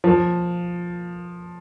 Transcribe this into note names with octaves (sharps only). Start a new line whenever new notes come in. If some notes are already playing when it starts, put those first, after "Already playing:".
F3